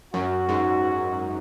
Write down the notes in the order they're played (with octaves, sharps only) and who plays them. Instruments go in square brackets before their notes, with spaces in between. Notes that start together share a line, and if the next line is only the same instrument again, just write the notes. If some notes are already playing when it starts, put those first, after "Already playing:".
[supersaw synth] F#2 [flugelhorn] F#4
[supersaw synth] G#2